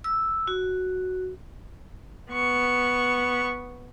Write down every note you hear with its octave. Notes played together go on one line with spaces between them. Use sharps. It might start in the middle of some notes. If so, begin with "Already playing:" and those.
E6
F#4
B3 C#6